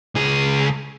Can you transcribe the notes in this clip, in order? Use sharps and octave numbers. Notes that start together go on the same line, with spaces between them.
C#2 G#4